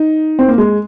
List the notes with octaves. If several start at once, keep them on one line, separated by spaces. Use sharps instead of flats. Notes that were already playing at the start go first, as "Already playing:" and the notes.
Already playing: D#4
C4
A#3
G#3